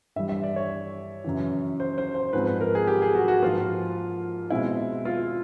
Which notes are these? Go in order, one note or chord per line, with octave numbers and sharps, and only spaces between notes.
G2 E3 G3 E5
E5
D5
C#5
F#2 C#3 E3
C5
C5
C5
G#2 F3 G#3 C4 B4
B4
A#4
G#4
G4
G#4
F#4
F#4
G#2 F3 A#3 F4
B2 G#3 C4 E4
F4